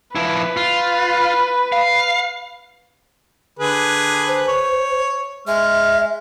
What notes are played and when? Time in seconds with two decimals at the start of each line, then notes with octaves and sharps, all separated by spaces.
0.16 F3 E4 B4
0.57 F4
1.72 F5
3.59 D3 G#4 B4
4.27 C5
4.48 C#5
5.48 G#3 E5 F6